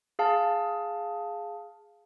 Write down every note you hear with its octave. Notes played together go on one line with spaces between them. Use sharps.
G#4 F5 A5